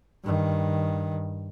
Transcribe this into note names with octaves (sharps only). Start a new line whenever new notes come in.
G2 D#3